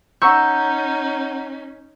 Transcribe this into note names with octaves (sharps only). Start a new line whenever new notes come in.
C#4 D#4 F#5 A#5 C#6 E6 G6